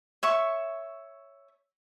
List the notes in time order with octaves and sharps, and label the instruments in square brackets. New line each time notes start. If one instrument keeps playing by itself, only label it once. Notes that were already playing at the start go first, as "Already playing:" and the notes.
[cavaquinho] C#5 E5 C#6